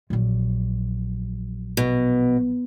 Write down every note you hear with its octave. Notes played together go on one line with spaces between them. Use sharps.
A#1 F#3
B2